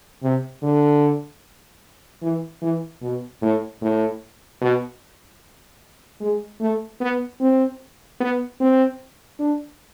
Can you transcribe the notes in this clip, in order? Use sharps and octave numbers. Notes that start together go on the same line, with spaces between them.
C3
D3
E3
E3
B2
A2
A2
B2
G#3
A3
B3
C4
B3
C4
D4